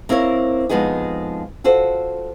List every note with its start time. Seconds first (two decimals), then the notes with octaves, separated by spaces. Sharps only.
0.09 A#3 C4 E4 A#4 C#5
0.69 F2 F3 G#3 B3 D#4 G#4
1.64 F4 F#4 A4 C5